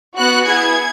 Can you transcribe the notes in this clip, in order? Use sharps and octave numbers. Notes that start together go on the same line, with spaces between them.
B3 F#4 F#6
B3 E4 G#4 G#6